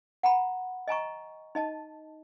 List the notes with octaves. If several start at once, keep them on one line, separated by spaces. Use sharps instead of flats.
F#5 A#5 B5
D#5 G#5 A#5 C#6
D#4 D#5 A5